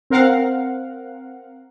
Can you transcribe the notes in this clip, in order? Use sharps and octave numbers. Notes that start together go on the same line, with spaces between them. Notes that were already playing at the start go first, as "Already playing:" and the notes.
C4 A#4 F5 F#5